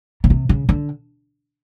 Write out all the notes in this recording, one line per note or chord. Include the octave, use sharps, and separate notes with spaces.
C#3
C3
C#3
D3